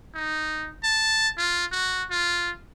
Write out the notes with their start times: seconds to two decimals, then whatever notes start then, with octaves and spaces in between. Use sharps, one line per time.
0.15 D#4
0.84 A5
1.37 F4
1.72 F#4
2.11 F4